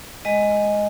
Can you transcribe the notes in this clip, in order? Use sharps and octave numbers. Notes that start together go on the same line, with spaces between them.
G#3 D#5